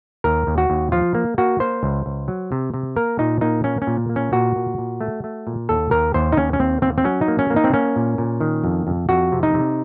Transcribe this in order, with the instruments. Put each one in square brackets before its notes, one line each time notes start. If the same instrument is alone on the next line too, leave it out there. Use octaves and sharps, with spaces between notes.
[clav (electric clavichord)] D#2 A#4
D#2
F#4
D#2
F3 F4
A#3
A#3 F#4
A#3 C5
C#2
C#2
F#3
C3
C3
A#3 A#4
A#2 D#4
A#3 D#4
A#3 C#4
C#4
A#2
A#3
C#4
A#2 F#4
A#2
A#2
A3
A3
A#2
D#2 A4
D#2 A#4
D#2 C5
D#4
D#2 C#4
C#4
D#2 C4
D#2 C4
C4
F#3 C#4
D#4
A#3
C#4
A#3
D#4
C4
A#3 C#4
A#2
A#2
D#3
F2
F2
F2 F#4
C3
D#4
C3